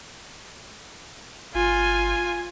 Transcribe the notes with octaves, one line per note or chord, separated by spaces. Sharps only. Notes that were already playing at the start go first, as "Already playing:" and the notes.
G1 F4 G#5